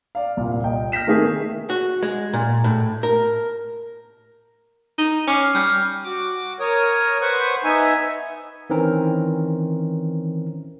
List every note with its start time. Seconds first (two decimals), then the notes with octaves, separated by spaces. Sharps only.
0.15 D5 F5
0.37 C2 A#2
0.64 D#5 G5
0.92 F6 G6 A#6 B6 E7
1.07 D#3 A3 A#3 C4 G#4
1.70 F#4
2.03 G#3
2.34 A#2
2.64 A2
3.03 A#4
4.98 D#4
5.28 C#4 D6 F6 C7
5.55 G3 F6 G6
6.04 F#4 D6
6.60 A#4 C#5 D#6
7.21 B4 C5 F#5 C#6
7.64 B3 D#4 E5 G#5
8.70 D#3 E3 C4 C#4 A#4